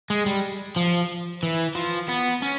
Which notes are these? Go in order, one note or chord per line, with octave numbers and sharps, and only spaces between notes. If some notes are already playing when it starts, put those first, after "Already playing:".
G#3
G3
F3
E3
F3
B3
C#4